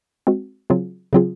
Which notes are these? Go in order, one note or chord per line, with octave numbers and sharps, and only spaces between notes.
G#3 C4 F#4
C#3 F#3 C4 F4 G#4
C#3 F#3 C4 F4 G#4